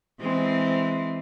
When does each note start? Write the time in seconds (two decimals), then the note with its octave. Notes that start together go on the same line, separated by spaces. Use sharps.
0.20 E3 G#3 C4